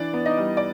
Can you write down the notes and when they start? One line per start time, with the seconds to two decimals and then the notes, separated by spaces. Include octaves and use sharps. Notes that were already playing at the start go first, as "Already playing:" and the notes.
Already playing: E3 D4 D5
0.13 B3
0.25 D#4 D#5
0.38 G3
0.57 D5